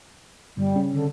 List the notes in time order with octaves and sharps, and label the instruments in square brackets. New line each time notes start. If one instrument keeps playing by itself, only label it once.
[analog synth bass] G1 [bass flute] G3
[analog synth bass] C#3
[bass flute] D3